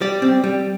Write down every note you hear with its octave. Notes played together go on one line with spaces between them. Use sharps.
G3 D5
C4
G3